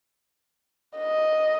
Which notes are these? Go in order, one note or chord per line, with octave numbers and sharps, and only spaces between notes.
D#5